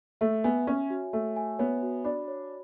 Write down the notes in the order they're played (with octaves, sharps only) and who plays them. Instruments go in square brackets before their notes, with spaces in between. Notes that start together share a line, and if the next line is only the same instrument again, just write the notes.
[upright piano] A3 [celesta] E5
[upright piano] B3 [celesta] G#5
[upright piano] C#4 [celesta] C#5
[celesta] F#4
[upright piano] A3 [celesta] E5
[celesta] G#5
[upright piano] B3 [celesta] C#5
[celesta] F#4
[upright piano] D4 [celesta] B5
[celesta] C#5